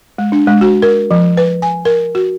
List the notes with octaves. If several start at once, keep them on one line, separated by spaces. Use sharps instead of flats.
G#3
D4
G#3
F#4
A#4
F3
B4
G#5
A#4
F#4